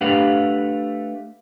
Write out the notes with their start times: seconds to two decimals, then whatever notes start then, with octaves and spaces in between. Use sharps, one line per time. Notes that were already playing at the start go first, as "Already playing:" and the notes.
0.01 A3 D4 G4 B4 F5 F#5